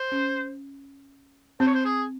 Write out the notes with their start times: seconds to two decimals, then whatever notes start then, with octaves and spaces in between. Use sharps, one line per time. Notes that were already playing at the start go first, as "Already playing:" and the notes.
Already playing: C5
0.12 C#4
1.60 C4 C5
1.67 C#5
1.74 C5
1.85 G#4